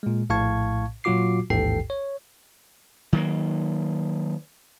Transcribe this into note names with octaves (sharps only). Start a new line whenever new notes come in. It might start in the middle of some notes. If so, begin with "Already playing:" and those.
A#2 G#3
A#1 A2 F5 A5 C#6 G#6
A#2 F#3 F4 F#4 D6 C7
A1 D#2 G#2 A4 G5 C7
C#5
D#3 F#3 A#3